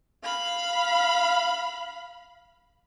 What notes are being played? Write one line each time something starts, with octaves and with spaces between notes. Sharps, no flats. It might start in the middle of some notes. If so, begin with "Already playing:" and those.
F5 B5